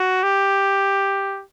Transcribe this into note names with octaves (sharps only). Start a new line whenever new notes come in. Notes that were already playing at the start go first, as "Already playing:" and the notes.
Already playing: F#4
G4